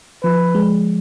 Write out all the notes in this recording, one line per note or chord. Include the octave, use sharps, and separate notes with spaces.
F3 B4
G#3